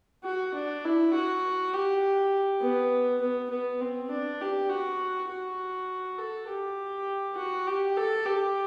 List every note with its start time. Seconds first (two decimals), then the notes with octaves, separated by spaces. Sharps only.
0.24 F#4
0.55 D4
0.85 E4
1.14 F#4
1.73 G4
2.62 B3
3.21 B3
3.51 B3
3.80 C4
4.10 D4
4.41 G4
4.70 F#4
5.29 F#4
6.19 A4
6.49 G4
7.36 F#4
7.67 G4
7.97 A4
8.26 G4